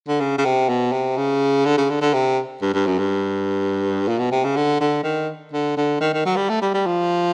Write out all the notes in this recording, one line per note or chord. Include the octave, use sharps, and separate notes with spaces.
D3
C#3
C#3
C3
B2
C3
C#3
D3
C#3
D3
D3
C3
G2
G2
F#2
G2
A#2
B2
C3
C#3
D3
D3
D#3
D3
D3
D#3
D#3
F#3
G3
A3
G3
G3
F3